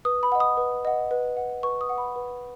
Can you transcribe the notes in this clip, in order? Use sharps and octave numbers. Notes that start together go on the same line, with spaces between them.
B4 D#6
B5
D#5 F#5
D#6
B4
D#5 F#5
B4
F#5
B4 C#6
D#6
F#5
B5
B4